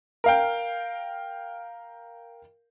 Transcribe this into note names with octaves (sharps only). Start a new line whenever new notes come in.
A#4 F5 G5